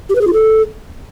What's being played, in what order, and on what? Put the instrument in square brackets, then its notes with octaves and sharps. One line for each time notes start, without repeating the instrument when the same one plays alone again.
[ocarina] G4
B4
G#4
F4
A4